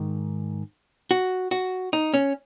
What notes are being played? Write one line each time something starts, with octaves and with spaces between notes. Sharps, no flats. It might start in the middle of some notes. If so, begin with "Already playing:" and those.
Already playing: G#2 D#3
F#4
F#4
D#4
C#4